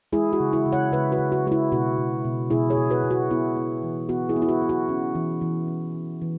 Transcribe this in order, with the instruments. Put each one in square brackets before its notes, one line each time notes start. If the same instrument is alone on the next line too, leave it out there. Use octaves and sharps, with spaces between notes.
[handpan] G#3 E4 G#4
F#4
C#3
E4
C#3
C#5 F#5
C#3 B4 E5
F#4 B4
C#3
F#4
G#3 F#4
E4
B2 F#4
B2
B2
B2 E4 G#4
G#4 C#5
B2
F#4 B4
B2
F#4
B3 E4
B3
E3
B3 F#4
E4 G#4
B3
E4
F#4
B3
F#4
C#4
E3
E3
C#4
C#4
E3